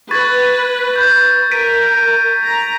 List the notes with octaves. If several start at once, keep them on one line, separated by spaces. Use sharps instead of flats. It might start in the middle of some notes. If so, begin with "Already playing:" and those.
B4 C#6 G#6 A6
G6
A#4 B6 D7 D#7
A#5